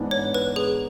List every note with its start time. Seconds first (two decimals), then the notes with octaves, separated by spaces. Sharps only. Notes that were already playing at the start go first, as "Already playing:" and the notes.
Already playing: G#2 E3 B3 D4
0.11 C#5
0.34 B4
0.56 G#4